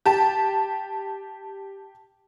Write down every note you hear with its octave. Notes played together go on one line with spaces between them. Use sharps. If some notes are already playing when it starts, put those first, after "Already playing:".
G4 A5